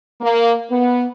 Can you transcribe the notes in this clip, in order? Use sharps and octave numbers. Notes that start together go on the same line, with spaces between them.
A#3
B3